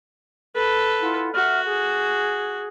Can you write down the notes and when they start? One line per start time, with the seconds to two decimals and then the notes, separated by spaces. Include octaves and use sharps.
0.55 A4 B4
0.99 E4 F4 F#5
1.35 F#4 E5 F#5 F6
1.64 G#4